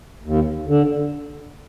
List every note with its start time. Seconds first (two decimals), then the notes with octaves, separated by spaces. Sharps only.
0.25 D#2
0.68 D3